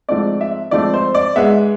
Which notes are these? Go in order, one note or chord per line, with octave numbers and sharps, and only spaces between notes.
G#2 F3 A3 C4 D5
E5
G#2 F3 A3 C4 D5
C5
D5
G#2 G#3 B3 E5